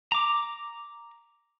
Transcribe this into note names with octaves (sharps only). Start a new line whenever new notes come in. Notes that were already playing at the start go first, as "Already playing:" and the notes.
A#5 D6